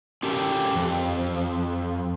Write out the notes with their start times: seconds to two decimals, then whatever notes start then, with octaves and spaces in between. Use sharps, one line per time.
0.23 C#4 G4 A4 A#4 G5
0.74 F2